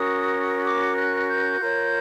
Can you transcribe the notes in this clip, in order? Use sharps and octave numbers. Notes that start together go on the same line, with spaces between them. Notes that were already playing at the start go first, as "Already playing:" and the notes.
Already playing: C#4 F#4 A#4 D#6
D6
F#6
G6
F4 A#4 C#5